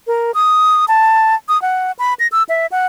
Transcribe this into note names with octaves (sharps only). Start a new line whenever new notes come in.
A#4
D#6
A5
D#6
F#5
B5
A#6
E6
E5
F#5